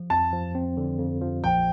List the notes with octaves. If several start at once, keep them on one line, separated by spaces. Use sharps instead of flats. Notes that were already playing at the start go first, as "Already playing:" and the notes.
Already playing: F3
F2 A5
F3
C4
D3
F2
F3
A#1 G5